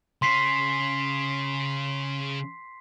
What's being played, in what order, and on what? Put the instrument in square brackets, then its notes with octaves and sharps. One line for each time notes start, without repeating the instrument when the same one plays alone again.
[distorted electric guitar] C#3 C#4 [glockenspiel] C6 B6 C7